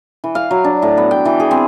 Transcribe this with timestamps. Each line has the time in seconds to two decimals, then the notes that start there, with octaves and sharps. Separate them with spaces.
0.24 E3
0.35 F5
0.51 F#3
0.64 D4
0.82 A2
0.97 B3
1.11 G5
1.25 E3
1.40 G#4
1.51 C4